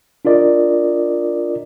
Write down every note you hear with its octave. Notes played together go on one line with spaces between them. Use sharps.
D4 F4 A#4 D5 D#5